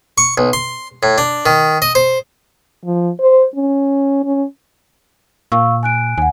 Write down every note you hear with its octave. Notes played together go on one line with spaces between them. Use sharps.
C#6
B1
C6
A2
D4
D#3
D#5
C5
F3
C5
C#4
C#4
A#2 F5 C#6 E6
G#5 F#6 D7
D#2 F#5 G#5